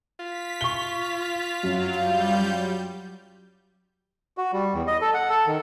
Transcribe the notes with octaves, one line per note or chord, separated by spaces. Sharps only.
F4 B6
C#6 G7
F#2 F#3
G3 F5 G6
F#3
F#4
G3
E2
D#5
A4
F#5
A4
D#3